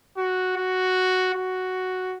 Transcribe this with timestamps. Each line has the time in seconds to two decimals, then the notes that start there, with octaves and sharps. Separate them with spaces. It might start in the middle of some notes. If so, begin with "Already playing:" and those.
0.17 F#4
0.57 F#4
1.34 F#4